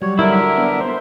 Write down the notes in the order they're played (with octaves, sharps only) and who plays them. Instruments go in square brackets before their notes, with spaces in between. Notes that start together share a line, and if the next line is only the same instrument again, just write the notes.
[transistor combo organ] F#3 G3 [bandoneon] C#5
[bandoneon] D3 A#4 [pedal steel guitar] E4
[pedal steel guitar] E5
[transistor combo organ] B3 D4
C5